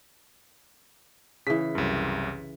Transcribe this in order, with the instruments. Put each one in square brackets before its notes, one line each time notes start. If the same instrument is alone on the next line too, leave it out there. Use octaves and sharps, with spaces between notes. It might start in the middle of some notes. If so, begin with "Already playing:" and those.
[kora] C#3 E3 [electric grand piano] B6
[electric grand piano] C2 F#2